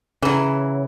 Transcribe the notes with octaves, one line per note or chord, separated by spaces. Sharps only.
C#3 E3 F#3